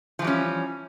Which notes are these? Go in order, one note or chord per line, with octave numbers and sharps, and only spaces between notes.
E3 F3 G3 C#4